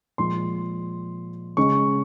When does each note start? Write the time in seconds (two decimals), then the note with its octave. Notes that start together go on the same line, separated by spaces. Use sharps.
0.18 A#2 F3 G#3 C6
1.57 C#3 G#3 C#4 C#6